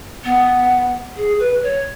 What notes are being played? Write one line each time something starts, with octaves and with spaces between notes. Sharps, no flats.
B3
G#4
B4
C#5